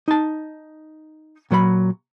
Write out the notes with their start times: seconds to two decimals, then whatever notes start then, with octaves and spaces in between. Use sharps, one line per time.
0.08 D#4 A5
1.51 A#2 F#3 C5 B5